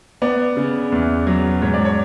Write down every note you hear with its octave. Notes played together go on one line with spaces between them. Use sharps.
B3 D5
C#3
E2
F#3
G#2 C#5
D5
C#5